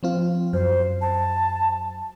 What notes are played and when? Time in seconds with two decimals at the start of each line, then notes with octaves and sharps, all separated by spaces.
0.03 F3 C4 F4
0.53 F#2 C5
1.01 A5